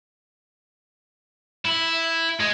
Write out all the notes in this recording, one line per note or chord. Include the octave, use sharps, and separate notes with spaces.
E4
G#3